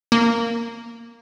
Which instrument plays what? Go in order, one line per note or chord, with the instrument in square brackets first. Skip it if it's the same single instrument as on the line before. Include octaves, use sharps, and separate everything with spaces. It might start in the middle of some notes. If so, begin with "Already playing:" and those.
[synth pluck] A#3